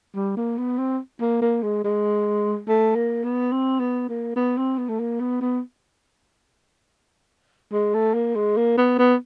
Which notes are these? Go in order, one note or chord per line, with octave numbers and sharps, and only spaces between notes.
G3
A#3
B3
C4
A#3
A#3
G#3
G#3
A3
A#3
B3
C4
B3
A#3
B3
C4
B3
A3
A#3
B3
B3
G#3
A3
A#3
G#3
A#3
B3
B3